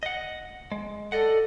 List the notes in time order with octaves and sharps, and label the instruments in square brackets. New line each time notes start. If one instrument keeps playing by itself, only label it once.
[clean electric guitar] D#5 F#5
G#3
[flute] A4 [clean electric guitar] D5 D#5 F#5